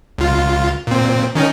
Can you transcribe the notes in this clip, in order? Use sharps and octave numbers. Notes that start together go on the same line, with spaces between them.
C#2 F4
A#2 C4
D#3 C#4 D#4